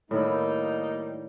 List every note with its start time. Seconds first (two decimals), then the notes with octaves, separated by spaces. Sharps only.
0.11 A2 D#3 G3 A#3 D#4 E4